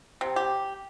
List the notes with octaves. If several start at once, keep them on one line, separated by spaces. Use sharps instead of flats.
C3
G4